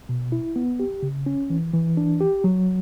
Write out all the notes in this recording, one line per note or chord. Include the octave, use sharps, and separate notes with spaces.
B2
E4
B3
G4
C#3
C#4
E3
E3
D4
G4
F#3